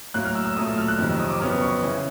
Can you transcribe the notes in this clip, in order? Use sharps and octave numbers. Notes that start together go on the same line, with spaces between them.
A2 F#3 A#3 F#6
F6
E6
E6
A#2 F#3 A3 D#6
E6
F6
F#6
F2 C3 D#3 F#3
E6
D#6
D6
F2 C#3 F#3 B3 F6
C#6
C#3 E3